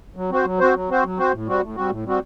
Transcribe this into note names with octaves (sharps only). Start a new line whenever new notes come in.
F#3
C4 F#4 C5
F#3
C4 F#4 C5
F#3
C4 F#4 C5
F#3
C4 F#4 C5
A2
G3 C4 F#4
A2
G3 C4 F#4
A2
G3 C4 F#4